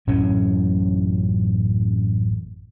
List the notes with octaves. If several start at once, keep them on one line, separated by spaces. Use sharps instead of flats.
A1 F#2 A2 C#4